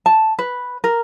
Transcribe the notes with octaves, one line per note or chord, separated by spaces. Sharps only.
A5
B4
A#4